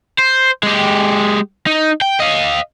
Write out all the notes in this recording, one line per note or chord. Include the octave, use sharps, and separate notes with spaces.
C5
G#3 G4
D#4
G5
D#5 F5